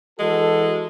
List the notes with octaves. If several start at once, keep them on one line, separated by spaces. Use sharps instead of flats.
E3 G#3 F#4 A4